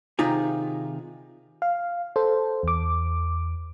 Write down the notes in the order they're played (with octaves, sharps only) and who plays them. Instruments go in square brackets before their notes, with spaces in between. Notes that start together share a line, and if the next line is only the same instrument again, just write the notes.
[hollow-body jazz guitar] C3 D#3 D#4 F4 G#4
[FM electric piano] F5
A4 C5
E2 D6